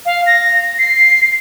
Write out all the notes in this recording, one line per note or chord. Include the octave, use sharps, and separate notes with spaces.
F5
A#6
C7